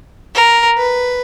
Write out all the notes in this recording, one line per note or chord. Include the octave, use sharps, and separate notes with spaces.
A#4
B4